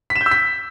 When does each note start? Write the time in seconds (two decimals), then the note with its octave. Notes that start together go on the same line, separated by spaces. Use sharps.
0.10 B6
0.16 E7
0.21 G6
0.26 E6
0.31 B6